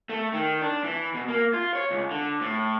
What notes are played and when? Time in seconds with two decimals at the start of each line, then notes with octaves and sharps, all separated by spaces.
0.09 A3
0.34 D#3
0.62 D4
0.84 E3
1.14 B2
1.28 A#3
1.54 F4
1.75 C#5
1.91 C#2
2.11 D3
2.41 A2